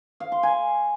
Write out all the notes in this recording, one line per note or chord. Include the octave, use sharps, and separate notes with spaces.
F5
C6
G#5